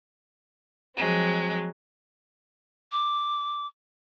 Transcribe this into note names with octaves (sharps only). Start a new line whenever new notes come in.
F3 F#3 G#3 C4
D6